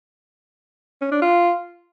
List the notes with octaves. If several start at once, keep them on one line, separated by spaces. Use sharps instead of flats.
C#4
D4
F4